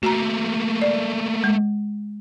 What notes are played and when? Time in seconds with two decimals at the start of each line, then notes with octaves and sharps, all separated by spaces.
0.03 A3 A#3 F#4 A#5
0.82 D5
1.44 G#3